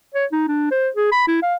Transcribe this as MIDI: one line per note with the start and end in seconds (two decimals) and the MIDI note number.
0.14 0.25 73
0.32 0.46 63
0.48 0.69 62
0.71 0.89 72
0.96 1.11 68
1.12 1.23 83
1.27 1.38 64
1.43 1.55 77